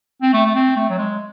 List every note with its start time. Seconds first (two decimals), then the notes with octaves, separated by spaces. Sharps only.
0.22 C4
0.33 A3
0.46 A3
0.55 C4
0.76 A3
0.90 F#3
0.98 G#3